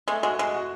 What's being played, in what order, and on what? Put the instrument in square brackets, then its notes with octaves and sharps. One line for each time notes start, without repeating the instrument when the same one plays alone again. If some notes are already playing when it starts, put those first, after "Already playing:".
[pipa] G#3 [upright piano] A3
[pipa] G#3 [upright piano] F#4
[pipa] G#3 [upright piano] F#4
[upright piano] F#4